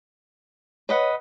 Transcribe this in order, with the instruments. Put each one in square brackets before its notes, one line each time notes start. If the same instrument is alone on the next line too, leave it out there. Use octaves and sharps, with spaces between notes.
[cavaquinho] B4 D#5 F#5 [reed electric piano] C#5